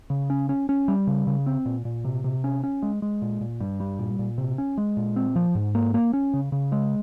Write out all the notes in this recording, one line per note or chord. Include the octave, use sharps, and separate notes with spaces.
C#3
C#4
C#4
C#4
G3
C#3
C#3
C4
A#2
A#2
C3
C3
C#4
C#4
G#3
G#3
A#2
A#2
G2
G3
A#2
A#2
C3
C#4
G#3
A#2
C4
F3
G#2
A#3
A#3
C#4
C#3
C#3
G#3